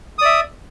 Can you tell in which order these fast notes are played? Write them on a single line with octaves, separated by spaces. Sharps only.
D#6 D5 E5